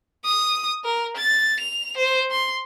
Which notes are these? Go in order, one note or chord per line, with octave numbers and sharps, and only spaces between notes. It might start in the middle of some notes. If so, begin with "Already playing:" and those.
D#6
A#4
A6
F7
C5
C6